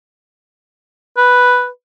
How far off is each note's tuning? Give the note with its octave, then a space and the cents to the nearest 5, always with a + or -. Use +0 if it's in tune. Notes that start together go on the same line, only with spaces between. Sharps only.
B4 +0